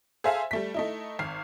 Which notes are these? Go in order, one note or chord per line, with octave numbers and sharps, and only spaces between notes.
G#4 A4 C5 E5 F5 G#5
G3 A3 B6
A3 D#4 E4
G#1 F6 C7